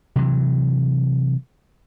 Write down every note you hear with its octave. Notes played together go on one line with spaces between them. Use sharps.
C3 E3 F#3